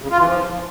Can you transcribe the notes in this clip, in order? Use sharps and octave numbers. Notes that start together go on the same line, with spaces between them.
C#3
F4
E3
F3